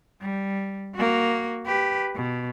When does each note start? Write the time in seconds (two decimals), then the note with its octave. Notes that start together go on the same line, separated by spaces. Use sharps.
0.21 G3
0.96 A#3 F#4
1.66 G4 B4
2.15 B2